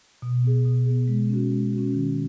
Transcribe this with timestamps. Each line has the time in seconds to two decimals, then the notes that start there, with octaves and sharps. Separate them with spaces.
0.22 B2
0.44 B3 G#4
0.65 B2
0.86 B3 G#4
1.08 G#3
1.29 C#4 F#4
1.52 G#3
1.73 C#4 F#4
1.94 D#3